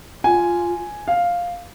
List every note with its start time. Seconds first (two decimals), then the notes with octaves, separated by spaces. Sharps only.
0.24 F4 G#5
1.08 F5